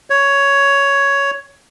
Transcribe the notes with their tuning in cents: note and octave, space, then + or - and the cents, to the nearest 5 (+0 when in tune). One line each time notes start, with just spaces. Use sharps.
C#5 +10